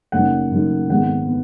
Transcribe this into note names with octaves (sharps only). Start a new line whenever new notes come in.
F#1 F#2 C#3 F#3 D#4 F#5
F#1 F#2 C#3 F#3 D#4
G#1 G#2 G#3 B3 F#5
B3